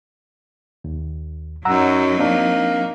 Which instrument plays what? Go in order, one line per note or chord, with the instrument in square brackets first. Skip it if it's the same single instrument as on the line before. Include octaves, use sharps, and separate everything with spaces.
[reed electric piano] D#2
[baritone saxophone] F#2 [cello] F#3 D#4 [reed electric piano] F#5 A#5 E6
[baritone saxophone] A#3 [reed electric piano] C4 D4